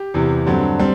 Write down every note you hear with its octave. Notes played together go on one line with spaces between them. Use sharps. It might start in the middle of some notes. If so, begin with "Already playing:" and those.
Already playing: G4
E2 C3 E3
G2 D3 F#3 C4
G3 C4